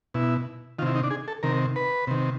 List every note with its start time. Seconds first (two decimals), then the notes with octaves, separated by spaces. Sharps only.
0.14 B2 E4
0.79 D#3 F4
0.82 C3 E4
0.96 D#4
1.03 D4
1.11 G#4
1.28 A4
1.43 C3 D#3 A#4
1.76 B4
2.07 C3 D#3